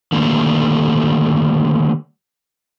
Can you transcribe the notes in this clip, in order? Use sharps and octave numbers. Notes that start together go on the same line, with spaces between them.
D3 D#3 G3 A3 A#3 D4